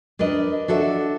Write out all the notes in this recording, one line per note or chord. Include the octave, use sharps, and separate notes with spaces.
D4 A#4 B4 D#5
D4 F#4 A4 E5